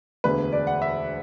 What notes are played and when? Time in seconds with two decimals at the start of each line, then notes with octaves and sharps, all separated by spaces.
0.24 E1 D2 D3 B4
0.52 D5
0.67 F#5
0.82 E5